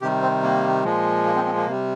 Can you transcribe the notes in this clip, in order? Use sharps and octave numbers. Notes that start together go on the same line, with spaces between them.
C3 D#3 G3 G4
C4
A#3
A#2 F3 G#3
A#3
C4
C4
A#3
C3 G3